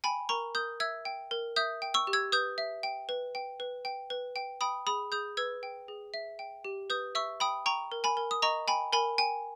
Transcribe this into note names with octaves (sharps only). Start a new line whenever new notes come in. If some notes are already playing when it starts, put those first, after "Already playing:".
G5 G#5 B5
A#4 A#5 C#6
A#4 D#6 G6
E5 E6 G#6
G5
A#4
E5 D#6 G6
G5
C#6 E6
G4
E6 G#6
B4 D#6 G6
E5
G5
B4
G5
B4
G5
B4
G5
G5 B5 D#6
G#4 B5 D#6
G#4 D#6 G6
B4 E6 G#6
G5
G#4
E5
G5
G4
B4 D#6 G6
E5 C#6 E6
G5 B5 D#6
G5 A#5 C#6
A#4
G#5 B5
A#4
D#6
D#5 A#5 C#6
G5 G#5 B5
A#4 G#5 B5
G5 G#5